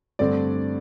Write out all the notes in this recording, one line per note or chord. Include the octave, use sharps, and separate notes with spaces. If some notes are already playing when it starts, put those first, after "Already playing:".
G2 D3 A3 C4 D5